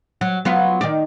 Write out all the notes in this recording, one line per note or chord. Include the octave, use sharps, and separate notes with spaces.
F#3
F#3 B3 F4
D#3 D5